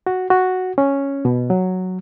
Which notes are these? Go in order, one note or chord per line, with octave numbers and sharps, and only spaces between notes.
F#4
F#4
C#4
B2
F#3